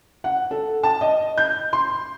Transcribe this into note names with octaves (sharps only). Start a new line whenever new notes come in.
F#5
A4
A5
D#5
G6
C6